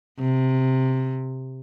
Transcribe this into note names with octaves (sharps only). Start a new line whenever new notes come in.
C3